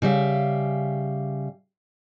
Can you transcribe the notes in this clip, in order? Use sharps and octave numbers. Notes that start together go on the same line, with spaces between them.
C#3 G3 E5 F5